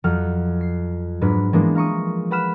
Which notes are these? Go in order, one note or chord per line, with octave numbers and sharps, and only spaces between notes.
F2 F#3 F#5 F6
C7
G#2 F#3 D4 B4 F6
E3 F3 G#3 A#3 B3 D4
F5 A#5 C#6 D#6
B4 F#5 B5 F6 E7